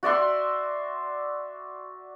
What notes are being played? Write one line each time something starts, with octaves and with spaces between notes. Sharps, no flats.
F#4 D5 E5 C6